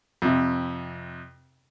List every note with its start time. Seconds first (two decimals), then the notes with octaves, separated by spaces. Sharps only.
0.22 F2 C3